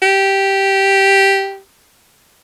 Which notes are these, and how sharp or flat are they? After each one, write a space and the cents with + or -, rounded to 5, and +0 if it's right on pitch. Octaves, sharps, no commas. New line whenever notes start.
G4 -5